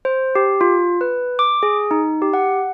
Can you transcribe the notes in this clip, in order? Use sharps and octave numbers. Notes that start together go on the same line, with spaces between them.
C5
G4
F4
B4
D6
G#4
D#4
G4
F#5